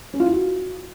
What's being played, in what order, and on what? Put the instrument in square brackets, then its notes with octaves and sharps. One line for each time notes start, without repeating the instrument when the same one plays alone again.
[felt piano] C#4
F4
E4
F#4